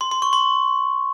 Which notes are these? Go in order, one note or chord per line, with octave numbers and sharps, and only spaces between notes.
C6
C6
C#6
C6